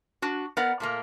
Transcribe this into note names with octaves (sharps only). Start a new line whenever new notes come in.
D4 F#4
B3 A#4 D5 F#5
A#2 A3 A#3